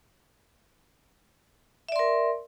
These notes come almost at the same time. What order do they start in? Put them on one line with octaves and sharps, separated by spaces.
E5 D5 C6 A#4